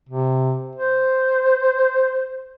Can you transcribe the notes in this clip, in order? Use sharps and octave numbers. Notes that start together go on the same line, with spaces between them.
C3
C5